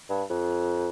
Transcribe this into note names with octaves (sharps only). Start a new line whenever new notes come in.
G2
F2